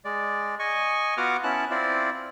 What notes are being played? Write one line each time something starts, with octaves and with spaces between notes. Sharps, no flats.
G#3 D5
D#5 G#5 C#6
B3 F4 F#4 F#5 D6 F6
B3 C#4 E4 A5 F#6
C4 E4 F4 D5